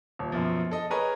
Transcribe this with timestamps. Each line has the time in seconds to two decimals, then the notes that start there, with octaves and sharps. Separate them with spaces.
0.19 D#1
0.32 F#2 B2 F3
0.71 A4 D#5
0.90 G#4 A#4 B4 C#5 D#5 G#5